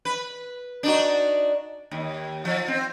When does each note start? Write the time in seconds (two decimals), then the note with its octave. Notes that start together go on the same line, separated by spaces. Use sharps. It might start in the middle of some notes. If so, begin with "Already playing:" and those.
0.05 B4
0.83 D4 D#4 F#4
1.91 D#2
2.45 F3
2.68 C4